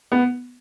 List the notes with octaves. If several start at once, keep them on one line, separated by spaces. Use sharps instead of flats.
B3